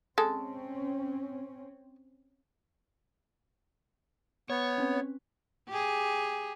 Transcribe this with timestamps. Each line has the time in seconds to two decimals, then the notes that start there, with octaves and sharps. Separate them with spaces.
0.18 G#3 C4 C#4 A4
4.50 B3 C#5
4.78 C4 C#4 B4
5.69 G4 G#4